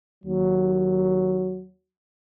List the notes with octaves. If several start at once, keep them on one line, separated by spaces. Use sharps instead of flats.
D#2 F#3